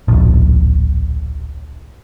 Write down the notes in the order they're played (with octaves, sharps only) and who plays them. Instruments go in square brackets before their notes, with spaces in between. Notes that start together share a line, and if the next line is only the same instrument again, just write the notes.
[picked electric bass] D1 A#1